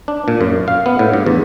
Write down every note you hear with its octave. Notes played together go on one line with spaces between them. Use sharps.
D4
A#2
F#2
F5
B3
A2
G2
E2